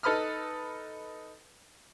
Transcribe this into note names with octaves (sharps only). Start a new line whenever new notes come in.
D#4 A4 B4 B5 D#6 F6